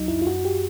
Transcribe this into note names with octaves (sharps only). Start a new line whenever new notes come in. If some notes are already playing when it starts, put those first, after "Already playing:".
Already playing: C#2 F#3 D#4
F#2 E4
F4
F#2 F#4
G4